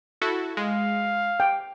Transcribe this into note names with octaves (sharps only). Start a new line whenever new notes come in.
E4 F#4 A4
G#3 F5
G5